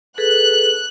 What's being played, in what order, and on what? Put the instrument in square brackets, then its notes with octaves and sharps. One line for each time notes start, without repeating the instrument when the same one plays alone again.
[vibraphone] G#4 A4 B4 [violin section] F#6